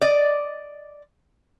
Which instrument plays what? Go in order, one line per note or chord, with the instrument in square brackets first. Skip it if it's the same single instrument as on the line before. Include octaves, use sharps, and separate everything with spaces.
[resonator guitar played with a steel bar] D5 D#5